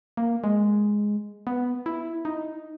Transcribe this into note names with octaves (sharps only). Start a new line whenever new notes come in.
A#3
G#3
B3
E4
D#4